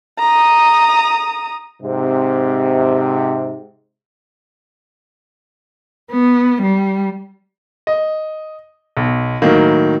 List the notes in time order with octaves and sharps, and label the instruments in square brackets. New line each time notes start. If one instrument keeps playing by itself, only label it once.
[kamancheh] A#5 D#6
[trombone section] G#2 C3
[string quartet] B3
G3
[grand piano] D#5
B1
A2 D#3 F#3 A#3